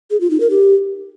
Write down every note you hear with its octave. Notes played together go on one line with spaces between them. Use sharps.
G#4
F4
D#4
A#4
G4